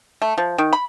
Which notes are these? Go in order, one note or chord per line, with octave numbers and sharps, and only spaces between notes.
A3
F3
D#3
B5